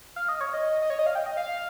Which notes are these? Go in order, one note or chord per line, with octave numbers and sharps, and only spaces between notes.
F5
D#5
C#5
D#5
D#5
C#5
D#5
F5
G5
D#5
F5